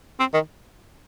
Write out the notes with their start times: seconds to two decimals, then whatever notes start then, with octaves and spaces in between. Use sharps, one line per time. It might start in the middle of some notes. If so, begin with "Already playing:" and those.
0.20 C4
0.34 D#3